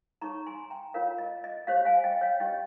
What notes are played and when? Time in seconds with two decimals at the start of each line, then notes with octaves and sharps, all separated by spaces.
0.22 D#4 G#4 C#5 A#5 C#6
0.46 G#5 C6
0.70 G5 A#5
0.94 F4 A#4 C#5 F5
1.18 D#5
1.44 D#5
1.67 G4 C5 C#5 F5
1.85 F5 G#5
2.04 D#5 G5
2.21 C#5 F5
2.40 C#4 G4 C#5 D#5 G5